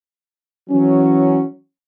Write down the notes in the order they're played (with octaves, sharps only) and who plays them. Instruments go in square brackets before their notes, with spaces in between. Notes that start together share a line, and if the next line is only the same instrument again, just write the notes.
[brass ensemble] E3 F#3 C#4